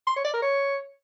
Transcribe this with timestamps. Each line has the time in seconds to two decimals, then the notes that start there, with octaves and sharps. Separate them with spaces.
0.07 C6
0.16 C#5
0.25 D5
0.34 A#4
0.42 C#5